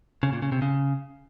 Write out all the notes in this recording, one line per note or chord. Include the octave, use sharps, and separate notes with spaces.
C#3
A#2
C#3
C3
C#3